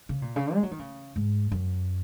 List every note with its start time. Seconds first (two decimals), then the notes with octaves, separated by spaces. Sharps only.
0.09 C#3
0.22 A#2
0.36 C#3
0.54 G#3
0.63 F#3
0.71 D#3
0.79 C#3
1.16 G#2
1.51 F#2